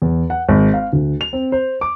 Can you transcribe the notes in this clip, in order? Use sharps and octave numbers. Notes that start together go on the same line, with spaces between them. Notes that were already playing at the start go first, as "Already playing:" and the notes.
E2
F#5
G#1
F5
D2
F7
C4
C5
D6